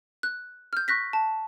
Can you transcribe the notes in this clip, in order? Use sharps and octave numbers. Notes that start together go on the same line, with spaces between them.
F#6
F6 G6
C#6 F#6 A#6 B6
A5